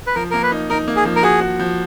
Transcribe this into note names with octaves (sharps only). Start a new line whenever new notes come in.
B4
F3 A#4
A#3 A#4
B4
D#4
D#4 A#4
A#3
G#4
F3
A#4
F#4 G#4
F#4
F3